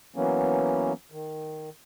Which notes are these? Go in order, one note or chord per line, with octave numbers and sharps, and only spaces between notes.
E3 F#3 A#3 B3 C#4
D#3